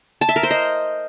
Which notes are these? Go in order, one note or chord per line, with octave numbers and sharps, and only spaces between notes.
A5
E5
A#4
C5
D#5